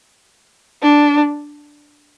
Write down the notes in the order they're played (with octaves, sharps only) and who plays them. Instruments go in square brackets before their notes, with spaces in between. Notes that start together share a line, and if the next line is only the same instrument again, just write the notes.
[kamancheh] D4